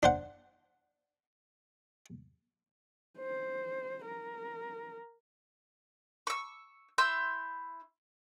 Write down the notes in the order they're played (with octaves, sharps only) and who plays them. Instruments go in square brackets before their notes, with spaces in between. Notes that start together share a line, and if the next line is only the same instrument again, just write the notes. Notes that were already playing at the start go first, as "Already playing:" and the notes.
[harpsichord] D4 C5 F#5
[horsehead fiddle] C5
A#4
[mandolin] C#6 E6
E4 C6 E6 G6